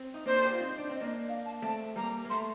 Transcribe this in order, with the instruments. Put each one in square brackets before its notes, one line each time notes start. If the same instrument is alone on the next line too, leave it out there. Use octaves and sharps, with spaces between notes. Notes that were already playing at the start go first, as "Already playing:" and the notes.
Already playing: [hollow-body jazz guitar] C4
D#4
[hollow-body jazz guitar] A#3 D4 [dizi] C5
[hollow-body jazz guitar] A4
G4
F4
C4 D#4
D4
C4
[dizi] D#5
[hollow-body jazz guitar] A#3 D4
[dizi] F5
A5
[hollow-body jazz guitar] A3 C4 [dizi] A5
[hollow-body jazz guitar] G3 A#3 [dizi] A#5
[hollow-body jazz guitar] A#3
[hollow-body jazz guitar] A3 [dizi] C6